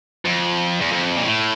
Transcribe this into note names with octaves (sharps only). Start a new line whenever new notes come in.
F2
E2
F2
A#2
A2